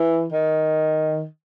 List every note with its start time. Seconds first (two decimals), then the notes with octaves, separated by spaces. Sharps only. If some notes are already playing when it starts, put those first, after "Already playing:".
Already playing: E3
0.32 D#3